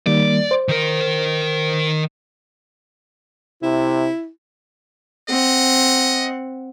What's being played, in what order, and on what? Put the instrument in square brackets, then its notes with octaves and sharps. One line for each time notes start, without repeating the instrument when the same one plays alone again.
[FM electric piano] D#3 G3 A#3 [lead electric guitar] D5
[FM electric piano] C5
[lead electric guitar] D#3 A#4
[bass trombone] C3 [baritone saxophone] E4
[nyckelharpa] C4 F#5 [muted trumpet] D#5